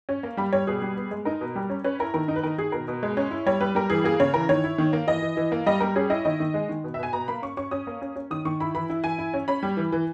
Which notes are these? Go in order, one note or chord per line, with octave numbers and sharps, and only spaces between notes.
C#4
A#3
G3 B5
G3 C#5
B2 G#4
G3
B3
G#3
D#4 A#4
B2
G3
C#4
C#4 B4
E4 A#4
D#3 A#4
D#4
B4
D#3 A#4
D#3 G#4
B2 A#4
B2
G#3
C#4
E4
G3 C#5
G3 B4
G3 A#4
E3 G#4
A#3 G#4
C#3 C#5
E3 A#4
D#3 C#5
E4
D#3
A#3
E3 D#5
E3
E3
A#3
G3 D#5
G3 A#4
C#4 G#4
E4 D#5
D#3 D#5
D#3
G#3
D#3
B2
E5
B2 G#5
B2 A#5
A#3 B5
C#4 C#6
C#4 C#6
C#4 D#6
A#3
C#4
C#4
D#3 D#6
D#3 C#6
E4 B5
E3 B5
E4
E3 G#5
E4
C#4
C#4 B5
G3
E3
E3